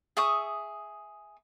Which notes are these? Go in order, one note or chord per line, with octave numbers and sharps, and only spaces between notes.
G#4 E5 C#6 D#6